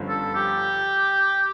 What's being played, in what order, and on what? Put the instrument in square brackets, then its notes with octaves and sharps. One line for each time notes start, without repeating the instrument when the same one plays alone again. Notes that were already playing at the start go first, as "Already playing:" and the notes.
Already playing: [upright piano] G1 G2 D3 F3 C#4
[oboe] A4
G4